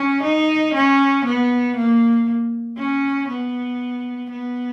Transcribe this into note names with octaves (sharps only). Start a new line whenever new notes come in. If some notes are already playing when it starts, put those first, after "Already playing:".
Already playing: C#4
D#4
C#4
B3
A#3
C#4
B3
B3